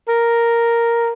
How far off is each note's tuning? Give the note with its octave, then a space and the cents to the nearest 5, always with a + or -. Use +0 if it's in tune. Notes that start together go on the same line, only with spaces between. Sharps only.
A#4 +0